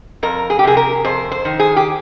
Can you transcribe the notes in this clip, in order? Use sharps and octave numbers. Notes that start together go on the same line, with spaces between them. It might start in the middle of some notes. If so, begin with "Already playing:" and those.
F2 A#4
G#4
G4
C3 G#4
A#4
F2 C5
C5
D#3
G#4
G4